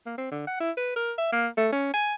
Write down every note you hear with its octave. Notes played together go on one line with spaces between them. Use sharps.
A#3
C4
D3
F#5
E4
B4
A#4
E5
A#3
A3
C#4
G#5